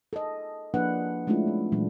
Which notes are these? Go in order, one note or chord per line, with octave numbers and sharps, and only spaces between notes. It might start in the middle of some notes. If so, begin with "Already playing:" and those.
A4 D#5
F3 A#3 D4 E4 B4 F#5
G#3 A3 C#4 D4 E4 F4
C4
A#2 E3 F#3 G#3 D4